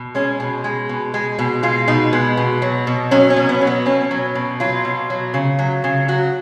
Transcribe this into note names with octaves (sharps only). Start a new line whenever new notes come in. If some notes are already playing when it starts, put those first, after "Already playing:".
Already playing: B2
G#3 C#4
B2
G#3
B2
G#3
B2
G#3 F4
B2 D#4
G#3 B3
B2
F#3
B2
F#3 C#4
C#4
B2
B3
F#3
B3
B2 C#4
F#3
B2
F#3 F4
B2
F#3
C#3
F#3
C#3
F#3 F#4